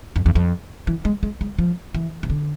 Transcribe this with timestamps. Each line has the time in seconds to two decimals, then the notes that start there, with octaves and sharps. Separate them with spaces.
0.16 F2
0.26 E2
0.35 F2
0.87 E3
1.05 G#3
1.23 G#3
1.41 G#3
1.59 F3
1.94 E3
2.23 C3
2.30 D3